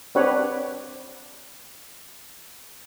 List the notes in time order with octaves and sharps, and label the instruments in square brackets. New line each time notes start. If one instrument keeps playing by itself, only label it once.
[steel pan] C4 D4 G4 B4 C#5 F#5